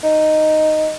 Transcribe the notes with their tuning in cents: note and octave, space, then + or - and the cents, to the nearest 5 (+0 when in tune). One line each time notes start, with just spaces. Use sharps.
D#4 -5